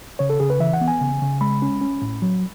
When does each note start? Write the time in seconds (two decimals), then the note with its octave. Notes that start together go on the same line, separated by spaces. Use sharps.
0.19 C#3 C#5
0.30 A4
0.40 C#3 G#4
0.50 B4
0.60 E3 E5
0.73 F#5
0.81 B3
0.88 G#5
1.01 C#3
1.22 C#3
1.41 G#3 B5
1.62 C#4
1.81 C#4
2.02 A2
2.22 F#3